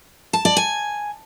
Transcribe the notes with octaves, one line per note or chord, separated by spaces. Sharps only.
A5
D5
G#5